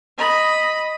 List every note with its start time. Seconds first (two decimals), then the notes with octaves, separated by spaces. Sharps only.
0.19 D#5 B5